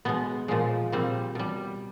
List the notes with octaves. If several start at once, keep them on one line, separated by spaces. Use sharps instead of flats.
B2 G#3 B3
A#2 F3 G#3
A#2 G3 C4
B2 G3